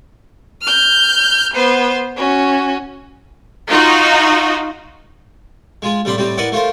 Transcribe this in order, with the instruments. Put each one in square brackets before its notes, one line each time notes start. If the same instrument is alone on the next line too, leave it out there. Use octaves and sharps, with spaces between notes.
[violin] F6 G6
B3 C5
C#4 F#4
[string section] D#4 F4 F#4
[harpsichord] G#3 F4 G#4
A1 G3 C4 D4 B5 C6
A2 G3 C4 G4
E4 A#4 B4 D5 D#5 F#5
A3 F4 A#4 C5